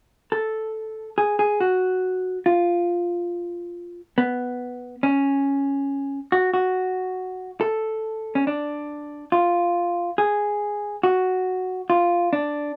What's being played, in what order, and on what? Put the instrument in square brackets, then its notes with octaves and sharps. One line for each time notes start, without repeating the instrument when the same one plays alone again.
[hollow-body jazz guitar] A4
G#4
G#4
F#4
F4
B3
C#4
F#4
F#4
A4
C#4
D4
F4
G#4
F#4
F4
D4